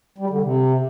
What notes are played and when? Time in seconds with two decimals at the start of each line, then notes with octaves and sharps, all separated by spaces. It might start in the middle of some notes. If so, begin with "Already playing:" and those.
0.18 G3
0.30 D3
0.41 C3